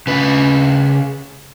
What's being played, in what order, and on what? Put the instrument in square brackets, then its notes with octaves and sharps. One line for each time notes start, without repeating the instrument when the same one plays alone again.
[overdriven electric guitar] C#3 B4